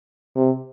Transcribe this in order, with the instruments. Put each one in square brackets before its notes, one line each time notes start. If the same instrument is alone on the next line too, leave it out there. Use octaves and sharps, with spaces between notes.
[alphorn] C3